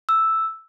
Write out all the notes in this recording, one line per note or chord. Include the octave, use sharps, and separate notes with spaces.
E6